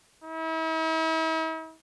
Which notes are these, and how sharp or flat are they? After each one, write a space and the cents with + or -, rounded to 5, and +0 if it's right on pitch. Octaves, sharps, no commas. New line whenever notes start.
E4 -45